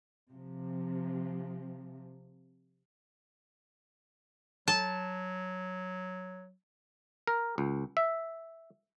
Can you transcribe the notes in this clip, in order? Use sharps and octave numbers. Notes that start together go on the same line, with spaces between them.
C3 F3
F#3 A5
A#4
C#2
E5